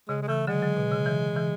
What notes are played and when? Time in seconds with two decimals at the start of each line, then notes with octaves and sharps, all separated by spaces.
0.08 C#3 G#3
0.22 G#3
0.28 C#3 E3 A3
0.47 D3 F#3 G#3
0.62 D3 F#3
0.77 B2
0.92 C#3
1.06 C#3 E3
1.36 C#3 E3